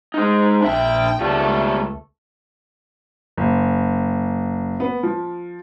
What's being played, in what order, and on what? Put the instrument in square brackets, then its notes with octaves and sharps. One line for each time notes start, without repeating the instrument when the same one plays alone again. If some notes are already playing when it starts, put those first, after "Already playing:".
[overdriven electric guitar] G#3 D#4
[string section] A#1 G5 [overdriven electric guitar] D4 E5
[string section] C#2 A3 [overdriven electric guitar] G3 F4
[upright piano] F#1
B3
F3